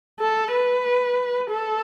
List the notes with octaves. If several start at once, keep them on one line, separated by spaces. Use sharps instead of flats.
A4
B4
A4